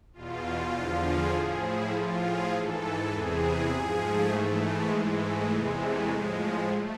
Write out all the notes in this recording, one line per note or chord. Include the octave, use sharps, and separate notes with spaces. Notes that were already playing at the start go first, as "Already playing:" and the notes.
E2 B2 F4
E2 D3 F3
G#4
A2 F3 G#4
E4
A2 F3 F4
G#4
G#2 E3 A4
E2 C3 E3 G#4
G#4
G#2 F3
A3
G#2 E3
G#3
G#2 E3
A3
E2 C3 E3 G#3
A3
A2 F3 G#3
A3